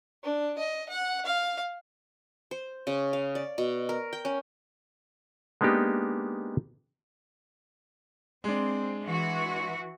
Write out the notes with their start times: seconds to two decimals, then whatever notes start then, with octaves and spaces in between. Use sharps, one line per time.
0.23 D4
0.58 D#5
0.89 F#5
1.25 F5
2.51 C5
2.87 C#3
3.13 F5
3.35 D5
3.58 B2
3.89 A#4
4.13 G5
4.25 C#4
5.61 G#3 A#3 B3 D4 D#4 G4
8.44 G#3 C4 D4
9.04 E3 F#4